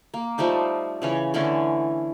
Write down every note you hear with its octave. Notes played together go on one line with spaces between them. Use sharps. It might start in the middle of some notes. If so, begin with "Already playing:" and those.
A#3
F3 G3 A3 D#4
C#3 E3 C#4
D3 E3 A3 C#4